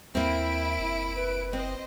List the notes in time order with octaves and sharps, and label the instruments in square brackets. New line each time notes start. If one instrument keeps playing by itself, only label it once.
[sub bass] D#2 [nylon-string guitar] A#3 C4 [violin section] E4 D7 [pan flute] E5
[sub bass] F#1
[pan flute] B4
[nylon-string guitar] C4 [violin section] C5 D#5